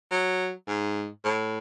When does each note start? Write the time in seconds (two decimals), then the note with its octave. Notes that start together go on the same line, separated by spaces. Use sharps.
0.11 F#3
0.68 G#2
1.25 A2